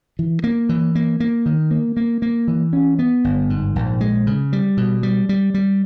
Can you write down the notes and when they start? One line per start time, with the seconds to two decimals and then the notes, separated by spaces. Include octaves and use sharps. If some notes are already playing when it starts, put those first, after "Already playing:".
0.19 E3
0.44 A#3
0.69 E3
0.95 A#3
1.20 A#3
1.46 D#3
1.71 A#3
1.97 A#3
2.22 A#3
2.48 E3
2.73 C#4
2.99 B3
3.24 G1
3.50 G#2
3.76 A#1
4.01 G#3
4.27 C#3
4.53 G3
4.77 B2
5.03 G3
5.29 G3
5.54 G3